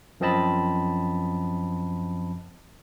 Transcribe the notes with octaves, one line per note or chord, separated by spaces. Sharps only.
F#2 F3 C4 D#5 A5 B5